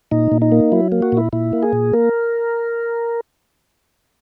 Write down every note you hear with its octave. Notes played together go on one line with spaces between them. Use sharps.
A#2 D#4
A#2
D#4
A#3
F#3 E4
A#3
F#4
A#2 E4
A#2 E4
A#3
G#4
A#2
A#3 A#4